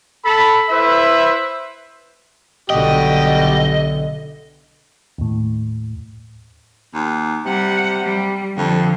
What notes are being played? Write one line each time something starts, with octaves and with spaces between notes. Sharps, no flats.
A4 B5
E4 B4 C5 E5
B1 D3 G3 F#4 G4 D#5
D#2 A2
D#2
C3 G3 F#5
G3
F2 D3 F3